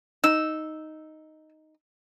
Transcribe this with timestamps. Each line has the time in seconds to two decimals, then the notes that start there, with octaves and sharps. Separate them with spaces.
0.24 D#4 E6